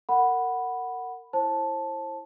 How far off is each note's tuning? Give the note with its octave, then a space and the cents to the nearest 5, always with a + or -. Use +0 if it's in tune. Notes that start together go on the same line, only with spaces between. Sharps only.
A#4 -25 F#5 +0 B5 +0
E4 +0 C5 +35 A5 -5